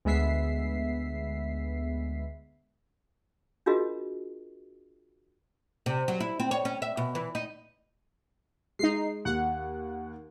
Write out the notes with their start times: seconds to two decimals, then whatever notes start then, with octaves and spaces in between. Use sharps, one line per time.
0.05 D2 G#3 B3 E5 B6 C7
3.66 D4 F4 F#4 G#4 A#4 D#5
5.86 C3
6.08 F#3
6.20 E4
6.40 C4
6.51 C#5
6.65 C#4
6.82 E5
6.97 B2
7.15 E3
7.35 D#4
8.79 G#3 D#4 C7
9.25 D#2 F#5